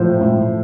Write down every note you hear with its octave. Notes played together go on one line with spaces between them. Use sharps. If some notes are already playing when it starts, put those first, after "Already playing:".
Already playing: A2 F3 C5
A2